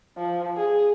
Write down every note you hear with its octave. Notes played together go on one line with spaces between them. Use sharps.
F3
G#4